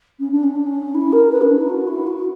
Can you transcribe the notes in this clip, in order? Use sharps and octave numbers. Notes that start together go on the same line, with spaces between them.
C#4
D4
C#4
D4
C#4
E4
A#4
B4
C#4
D4
E4
F#4
E4
F#4